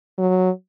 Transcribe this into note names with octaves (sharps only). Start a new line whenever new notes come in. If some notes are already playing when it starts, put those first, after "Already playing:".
F#3